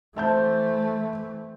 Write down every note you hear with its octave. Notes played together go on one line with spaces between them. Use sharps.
E3 A3 C4 E5 A5 G6